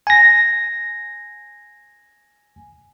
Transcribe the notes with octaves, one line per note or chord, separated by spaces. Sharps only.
G#5 A#6